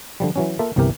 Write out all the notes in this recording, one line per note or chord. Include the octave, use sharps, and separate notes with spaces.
D3 F3 G3
E3 F#3 C#4
A#3 F4 A4 E5
G1 C2 C3 E3 G4 A#4